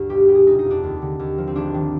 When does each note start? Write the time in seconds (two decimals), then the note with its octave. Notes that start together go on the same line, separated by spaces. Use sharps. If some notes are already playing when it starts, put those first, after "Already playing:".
Already playing: D2 G2
0.09 B1 G4
0.28 B2 G4
0.35 G#4
0.46 F1 D#4
0.59 D#4
0.64 F2
0.70 D4
0.84 D#2
1.02 D3
1.19 D#2
1.38 F3
1.47 C4
1.56 G#1 D4
1.74 D#3